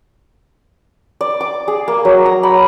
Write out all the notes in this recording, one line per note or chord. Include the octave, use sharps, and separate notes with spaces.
D5
D6
G#4
A#3
F#3
A#5
B5